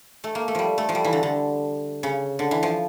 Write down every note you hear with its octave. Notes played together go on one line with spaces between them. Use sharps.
A3
A#3
A3
F3 G3
A3
F3
G3
E3
D3
D3
C#3
D3
E3
F3